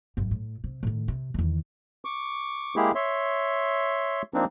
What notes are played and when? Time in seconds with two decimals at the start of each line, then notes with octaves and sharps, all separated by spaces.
0.17 G#1 F#2
0.31 A2
0.64 C3
0.83 A2 D#3
1.08 C3
1.34 E2 D#3
2.05 C#6 D6
2.76 G#3 A#3 E4 G4 G#4
2.95 C#5 E5 C6
4.34 F3 A#3 C4 D4 D#4